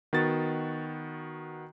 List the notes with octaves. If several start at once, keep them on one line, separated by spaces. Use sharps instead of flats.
D#3 B3 F#4 A6